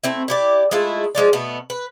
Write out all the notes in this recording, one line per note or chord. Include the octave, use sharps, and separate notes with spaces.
A3 C4 E4
E4 G4 D5
G#3 A3 E4 F4
F3 G#3 F4 D5
B2 A3 B3
B4